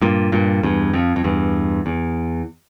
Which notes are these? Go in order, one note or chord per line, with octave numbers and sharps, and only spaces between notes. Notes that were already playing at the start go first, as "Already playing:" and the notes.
G2 A#2
G2 A#2
E2 G2
F2
F2
E2 G2
E2